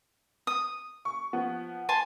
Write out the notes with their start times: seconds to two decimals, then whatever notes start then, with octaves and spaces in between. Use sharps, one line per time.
0.47 D#6
1.05 C#6
1.33 F3 B3
1.89 G#5 A5 C6